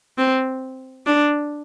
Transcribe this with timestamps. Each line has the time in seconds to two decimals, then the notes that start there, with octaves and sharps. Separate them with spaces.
0.18 C4
1.06 D4